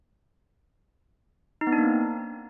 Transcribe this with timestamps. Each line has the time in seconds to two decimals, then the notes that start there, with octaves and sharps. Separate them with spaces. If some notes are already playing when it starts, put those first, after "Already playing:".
1.61 D#4
1.67 B3
1.72 D4
1.78 A#3
1.84 C4